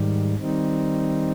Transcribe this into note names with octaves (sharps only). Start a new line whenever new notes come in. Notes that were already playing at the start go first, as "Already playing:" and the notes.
Already playing: G#2 D#3 G3
D#3 G3 C4 D#4